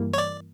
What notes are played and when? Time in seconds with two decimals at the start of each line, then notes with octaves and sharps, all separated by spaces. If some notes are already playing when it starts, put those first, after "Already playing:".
Already playing: G2 E3 G3 A#3
0.14 C#5
0.18 D5